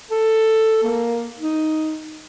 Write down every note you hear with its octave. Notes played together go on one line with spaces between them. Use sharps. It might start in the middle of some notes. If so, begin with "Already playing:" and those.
A4
A#3
D#4